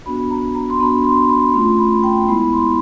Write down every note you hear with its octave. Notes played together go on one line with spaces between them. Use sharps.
B3 D4 F#4 B5
A#5
A#5
C6
B3 D4 F#4 B5
C6
B5
A3 C#4 F4 C6
B5
G5
G#3 B3 E4 B5
C6